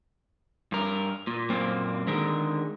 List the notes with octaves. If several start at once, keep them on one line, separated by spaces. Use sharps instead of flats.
G2 A#4
A#2
F#2 A#2 A#3 C4
D3 D#3 G#3 A#4